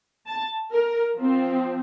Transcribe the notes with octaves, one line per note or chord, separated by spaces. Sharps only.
A5
A#4
F3 C4